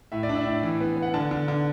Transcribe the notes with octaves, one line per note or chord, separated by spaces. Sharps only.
A2 E5
D5
D4
E5
A2
E3
B3
B3
F#5
D3 A5
D3
D3